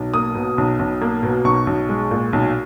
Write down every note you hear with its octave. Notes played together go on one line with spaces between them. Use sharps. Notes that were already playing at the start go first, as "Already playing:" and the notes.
Already playing: B1
A#3 D#6
B2
B1
B1
A#3
B2
B1 C#6
B1
G#3
A#2
B1